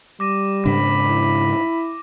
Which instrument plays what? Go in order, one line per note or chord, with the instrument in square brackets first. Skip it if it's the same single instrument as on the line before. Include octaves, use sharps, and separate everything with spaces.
[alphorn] G3 [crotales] D6 A#6 D#7
[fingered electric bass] G#2 C#3 D4 [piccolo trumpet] B5
[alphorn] E4